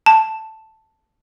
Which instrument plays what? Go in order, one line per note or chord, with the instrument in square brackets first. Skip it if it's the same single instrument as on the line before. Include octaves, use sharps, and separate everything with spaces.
[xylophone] A5